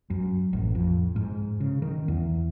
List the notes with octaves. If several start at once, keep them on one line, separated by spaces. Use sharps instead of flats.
F#2
A1
F2
G#2
C#3
D#3
E2